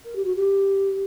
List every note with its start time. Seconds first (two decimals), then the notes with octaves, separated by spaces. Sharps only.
0.05 A#4
0.15 G4
0.24 F#4
0.35 G4